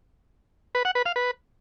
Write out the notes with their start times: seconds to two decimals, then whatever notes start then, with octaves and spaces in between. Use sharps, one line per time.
0.75 B4
0.85 F#5
0.95 B4
1.06 F5
1.16 B4